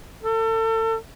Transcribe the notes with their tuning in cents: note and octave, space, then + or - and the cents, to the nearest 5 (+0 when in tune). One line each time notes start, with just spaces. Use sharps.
A4 +35